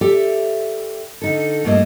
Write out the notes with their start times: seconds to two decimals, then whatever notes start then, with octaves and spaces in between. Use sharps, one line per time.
0.01 G4 A4 D5 E5
1.22 D3 D#4 A4
1.64 G2 A3 A#3 E4 D#5